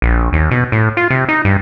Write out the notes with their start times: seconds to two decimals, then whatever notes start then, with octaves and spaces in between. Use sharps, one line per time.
0.02 A#1
0.33 D#2
0.51 B2
0.72 A2
0.97 F4
1.10 C3
1.29 D#4
1.45 G2